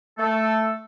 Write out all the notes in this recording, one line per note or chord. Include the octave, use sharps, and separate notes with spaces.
A3 A4